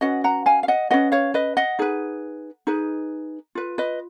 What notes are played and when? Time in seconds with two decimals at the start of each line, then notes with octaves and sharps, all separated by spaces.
0.01 C#4 F#4 B4 D#5 F#5
0.24 F#5 A#5
0.46 F5 G#5
0.63 F5
0.68 D#5 F#5
0.90 C#4 F#4 B4 D#5 F#5
1.12 C#5 F5
1.34 B4 D#5
1.57 D#5 F#5
1.79 D#4 G#4 B4
2.67 D#4 G#4 B4
3.55 F4 B4
3.78 B4 D#5